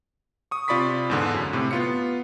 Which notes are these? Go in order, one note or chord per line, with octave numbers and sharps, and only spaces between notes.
C#6 D#6
C3 F4 D5 B5 C#6 B6
E2 G#2 D3
F#2
A2 C3
B3 F4 C#7